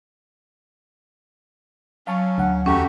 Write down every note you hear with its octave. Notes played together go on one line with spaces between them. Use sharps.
F#3 C#4 F5 A5 C#6
D2 D3 F#5
E2 A3 C#4 F#4 G4 A#5